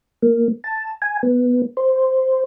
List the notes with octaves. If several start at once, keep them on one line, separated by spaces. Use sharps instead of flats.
A#3
A5
G#5
B3
C5